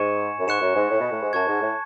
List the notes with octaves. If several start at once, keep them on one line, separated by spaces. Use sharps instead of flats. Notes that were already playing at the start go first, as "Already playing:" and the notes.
Already playing: G#2 G#5 C#6 G#6 C#7 E7
F#2
G#2 C#6 F#6 C#7 E7
F#2
G#2
A2
B2
A2
G#2
F#2 A5 C#6 G#6
G#2
A2